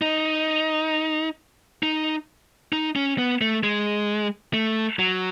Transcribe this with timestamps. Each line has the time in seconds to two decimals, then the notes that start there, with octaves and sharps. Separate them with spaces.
0.02 D#4
1.83 D#4
2.73 D#4
2.96 C#4
3.18 B3
3.41 A3
3.64 G#3
4.54 A3
4.99 F#3